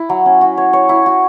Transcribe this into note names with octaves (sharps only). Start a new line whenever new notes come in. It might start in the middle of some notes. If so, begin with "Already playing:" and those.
Already playing: E4
F#3
C#4
F#4
C#5
C#5
E4
F#4